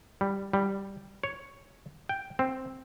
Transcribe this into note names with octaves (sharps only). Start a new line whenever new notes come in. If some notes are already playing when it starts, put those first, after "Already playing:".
G3
G3
C#5
G5
C4